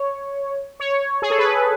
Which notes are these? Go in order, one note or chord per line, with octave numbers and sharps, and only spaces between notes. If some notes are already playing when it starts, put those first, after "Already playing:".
Already playing: C#5
C#5
G#4
A4
B4